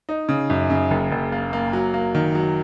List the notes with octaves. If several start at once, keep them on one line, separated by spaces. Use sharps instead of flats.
D#4
C#3
F#2
C#3
F#1
F#1
A#3
A#3
F#3
A#3
D#3
F#3